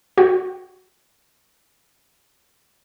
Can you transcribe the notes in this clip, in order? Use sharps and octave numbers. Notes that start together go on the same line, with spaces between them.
F#4 G5